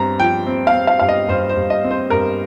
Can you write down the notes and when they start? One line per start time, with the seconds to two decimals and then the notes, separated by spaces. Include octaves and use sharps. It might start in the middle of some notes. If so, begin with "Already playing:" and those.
Already playing: G2 C4 A#5
0.20 F3 G5
0.47 C4
0.67 F5
0.74 C4
0.87 F5
0.99 G2 F5
1.09 D#5
1.28 G2 C5
1.49 C5
1.57 G2
1.70 D#5
1.84 C4
1.91 C5
2.10 G2 A#4